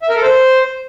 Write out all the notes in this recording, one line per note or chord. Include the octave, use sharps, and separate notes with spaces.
E5
A#4
A4
C5